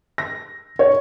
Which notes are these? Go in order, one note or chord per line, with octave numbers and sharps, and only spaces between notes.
A#6
C#5